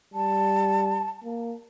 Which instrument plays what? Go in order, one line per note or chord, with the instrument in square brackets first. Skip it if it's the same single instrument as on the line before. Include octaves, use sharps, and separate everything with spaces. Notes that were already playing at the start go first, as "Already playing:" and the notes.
[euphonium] G3 [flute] A5
[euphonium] A#3